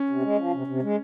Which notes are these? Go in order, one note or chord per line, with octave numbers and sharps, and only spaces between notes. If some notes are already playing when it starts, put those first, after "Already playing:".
Already playing: C#4
C3
G#3
F3
C3
C3
G#3